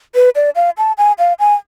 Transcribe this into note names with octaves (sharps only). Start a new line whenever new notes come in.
B4
D5
F5
A5
G#5
F5
G#5